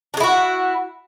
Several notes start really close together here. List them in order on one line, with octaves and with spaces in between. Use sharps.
D4 G#4 E4 F#4